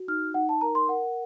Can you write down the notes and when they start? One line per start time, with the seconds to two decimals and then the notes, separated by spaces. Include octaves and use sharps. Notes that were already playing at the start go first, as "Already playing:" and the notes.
Already playing: F#4
0.08 D#4 F6
0.34 D#4 F#5
0.49 A5
0.61 A#4 A#5
0.75 C6
0.88 A#4 F#5